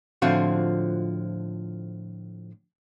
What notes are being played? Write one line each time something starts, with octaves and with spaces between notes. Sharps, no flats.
A2 D3 F3 C4 F4 F#4